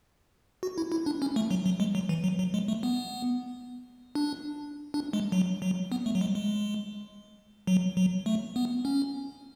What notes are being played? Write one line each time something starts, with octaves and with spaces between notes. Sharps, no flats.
F#4
E4
E4
D4
C#4
A3
F#3
F#3
G#3
F#3
E3
F#3
F#3
G#3
A3
B3
D4
D4
G#3
F#3
F#3
B3
A3
F#3
G#3
G#3
F#3
F#3
A3
B3
C#4